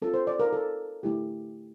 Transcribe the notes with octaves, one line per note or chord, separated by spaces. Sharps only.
C4 F4 A4
C5
D5
A#4
A4
A3 E4 G4